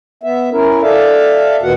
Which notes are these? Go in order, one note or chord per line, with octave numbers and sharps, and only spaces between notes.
B3 E5
C#4 E4 A#4
A4 D5 E5 F5
D2 A#2 D#3 B3 F#4 F#5